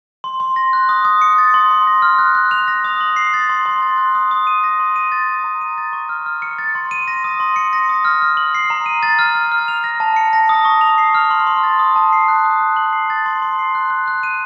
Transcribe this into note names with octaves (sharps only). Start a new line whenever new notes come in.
C6
C6
A#6
F#6
D#6
D#6
C#7
A6
C6
C6
A#6
F6
F#6
F#6
F7
A#6
D#6
F#7
C7
A6
C6
C6
A6
F#6
D#6
D#6
D#7
A#6
C6
D#7
A6
D#6
A#5
D#7
A6
C#6
F6
F6
C#7
A6
C6
D#7
A#6
D#6
C6
C#7
A#6
D#6
F6
F6
F#7
C7
A#5
D#7
A6
F6
F6
F6
F7
A#6
A5
C#7
A#6
D#6
C#6
F7
C7
F6
C6
C6
A6
D#6
A5
C7
F#6
D#6
F#6
F#7
C7
A6
C6
C6
C7
F#6
F#6
F#6
D#7